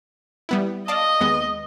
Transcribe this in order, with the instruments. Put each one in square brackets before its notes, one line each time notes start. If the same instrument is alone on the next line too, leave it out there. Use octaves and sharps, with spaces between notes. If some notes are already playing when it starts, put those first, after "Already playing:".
[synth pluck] G3 B3 E4
[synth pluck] D5 F5 A5 [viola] D#5
[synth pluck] D#2 G#3 B3